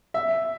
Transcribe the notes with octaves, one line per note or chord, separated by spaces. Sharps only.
E5